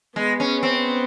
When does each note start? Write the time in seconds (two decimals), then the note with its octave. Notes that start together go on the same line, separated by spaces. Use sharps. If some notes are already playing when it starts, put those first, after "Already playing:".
0.16 G#3 B3
0.40 C#4
0.63 C4